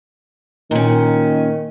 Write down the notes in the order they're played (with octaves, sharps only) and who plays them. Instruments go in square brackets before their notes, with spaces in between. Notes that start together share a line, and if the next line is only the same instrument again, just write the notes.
[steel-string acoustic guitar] A#2 C#4 [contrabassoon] D#3